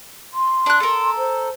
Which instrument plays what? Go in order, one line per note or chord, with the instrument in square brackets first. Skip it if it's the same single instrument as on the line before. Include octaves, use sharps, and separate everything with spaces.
[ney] C6
[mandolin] D4 F#6
A4 A#4
[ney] C5